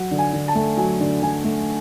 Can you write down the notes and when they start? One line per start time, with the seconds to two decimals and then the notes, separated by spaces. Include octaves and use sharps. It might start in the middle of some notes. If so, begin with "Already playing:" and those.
Already playing: F#3 F#5
0.11 D3
0.18 G#5
0.33 D3
0.48 A5
0.55 A3
0.77 F#3 G#5
1.00 D3
1.22 D3 G#5
1.44 A3